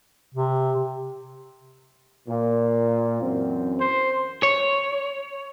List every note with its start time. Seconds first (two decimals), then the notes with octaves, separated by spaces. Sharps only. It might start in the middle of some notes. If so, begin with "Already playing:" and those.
0.34 C3
2.28 A#2
3.21 F#2 E3 C4
3.80 C5
4.43 C#5